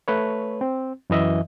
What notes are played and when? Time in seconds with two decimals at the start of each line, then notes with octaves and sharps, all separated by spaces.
0.08 A3 B4 C#5
0.61 C4
1.10 F#2 E3 D#5 E5